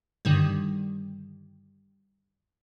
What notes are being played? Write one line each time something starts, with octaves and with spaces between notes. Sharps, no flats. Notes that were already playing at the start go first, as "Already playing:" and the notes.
G2 D3 D#3 G3